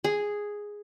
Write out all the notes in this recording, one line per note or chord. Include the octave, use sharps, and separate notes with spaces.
G#4